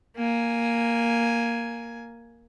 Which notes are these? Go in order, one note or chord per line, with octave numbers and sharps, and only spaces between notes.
A#3 G#5